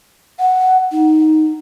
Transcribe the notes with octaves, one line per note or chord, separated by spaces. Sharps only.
F#5
D#4